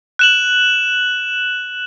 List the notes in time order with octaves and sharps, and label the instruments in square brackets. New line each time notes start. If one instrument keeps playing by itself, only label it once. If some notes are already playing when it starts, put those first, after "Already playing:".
[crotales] F#6 E7 F#7